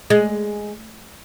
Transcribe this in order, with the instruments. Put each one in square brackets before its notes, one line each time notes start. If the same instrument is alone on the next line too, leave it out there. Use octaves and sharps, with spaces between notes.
[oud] G#3